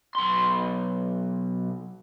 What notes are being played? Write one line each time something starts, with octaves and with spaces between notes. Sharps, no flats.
B1 C6